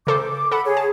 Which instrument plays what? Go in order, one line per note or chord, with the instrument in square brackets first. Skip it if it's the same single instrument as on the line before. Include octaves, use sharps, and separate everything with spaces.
[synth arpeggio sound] C#3 A4 C5 [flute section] D6
[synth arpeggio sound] A4 F#5 [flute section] B5
[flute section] G#4 C#5
[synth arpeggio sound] A5